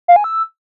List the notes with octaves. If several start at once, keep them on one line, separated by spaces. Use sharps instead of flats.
F5
G#5
E6